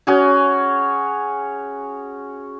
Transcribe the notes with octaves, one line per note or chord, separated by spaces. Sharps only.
C#4 F#4 G#4